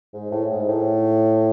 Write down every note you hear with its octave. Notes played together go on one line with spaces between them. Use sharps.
G#2
A2
G#2
A2